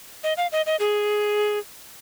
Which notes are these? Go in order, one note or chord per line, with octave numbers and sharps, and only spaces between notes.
D#5
F5
D#5
D#5
G#4